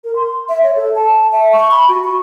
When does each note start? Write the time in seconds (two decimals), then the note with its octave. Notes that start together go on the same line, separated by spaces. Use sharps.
0.04 A#4
0.16 C6
0.49 E5
0.63 C#5
0.76 A4
0.96 A5
1.32 E5
1.53 C#6
1.71 B5
1.88 F#4
2.04 C#6